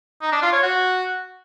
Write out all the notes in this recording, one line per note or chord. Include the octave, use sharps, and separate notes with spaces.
D#4
D4
F4
C#5
F#4